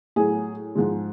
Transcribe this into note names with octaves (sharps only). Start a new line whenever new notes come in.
A2 F#3 G#4
G#2 F3 G#3